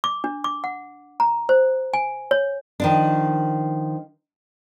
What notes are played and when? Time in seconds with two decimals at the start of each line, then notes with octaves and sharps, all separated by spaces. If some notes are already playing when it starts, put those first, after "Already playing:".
0.04 D6
0.24 D4
0.44 D6
0.64 F#5
1.20 A#5
1.49 C5
1.94 G#5
2.31 C#5
2.80 D#3 F3 D4